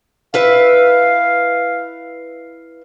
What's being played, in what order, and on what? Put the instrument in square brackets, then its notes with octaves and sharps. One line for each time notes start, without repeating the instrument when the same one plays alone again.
[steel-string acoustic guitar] E4 B4 E5 [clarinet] F5